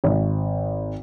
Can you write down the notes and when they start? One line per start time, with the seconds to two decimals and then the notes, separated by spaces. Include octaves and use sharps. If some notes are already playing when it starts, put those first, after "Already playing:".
0.04 G#1